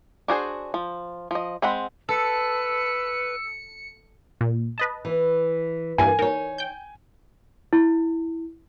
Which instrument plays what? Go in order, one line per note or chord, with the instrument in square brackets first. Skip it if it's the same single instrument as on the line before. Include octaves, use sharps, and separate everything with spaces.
[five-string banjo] D4 F#4 G#4 C5
F3
F3 D#5
G#3 C4 F#5 B5
[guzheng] A4 [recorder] B4 [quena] E6 [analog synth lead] C#7
[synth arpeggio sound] A#2
B4 D#5 A5
[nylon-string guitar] E3
[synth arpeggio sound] G2 E3 A#3 [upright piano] G#5
[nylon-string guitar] D#4 C#5 [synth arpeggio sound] A#4
[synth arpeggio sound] G5 G6
[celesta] E4